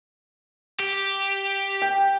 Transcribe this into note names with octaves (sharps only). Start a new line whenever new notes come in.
G4
G5